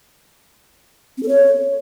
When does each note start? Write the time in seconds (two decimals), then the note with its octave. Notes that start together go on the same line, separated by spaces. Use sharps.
1.17 C4
1.23 A4
1.28 C#5